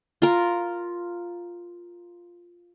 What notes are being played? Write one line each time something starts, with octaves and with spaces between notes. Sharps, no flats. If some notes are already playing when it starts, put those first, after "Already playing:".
F4 A#4